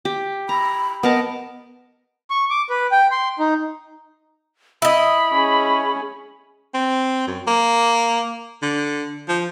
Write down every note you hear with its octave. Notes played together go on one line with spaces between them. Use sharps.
G4
A#5 B5
B3 A#4 D#5 A5
C#6
D6
B4
G5
C6
D#4
E4 D#5 B5
C#4 G#4
C4
F#2
A#3
D3
F3